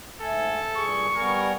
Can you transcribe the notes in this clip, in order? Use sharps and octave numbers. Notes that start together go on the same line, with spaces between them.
G#2 A3 A4 G#5
G2 A#2 G#4 C#6
G3 B3 A#4 G#5